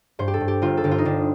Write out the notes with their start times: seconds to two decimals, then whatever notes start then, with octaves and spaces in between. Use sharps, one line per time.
0.19 G2 C5
0.28 G4
0.34 A4
0.41 G2
0.48 G4
0.62 G1 F4
0.77 A4
0.84 G1 G4
0.91 F4
0.98 D#4
1.05 G1 D4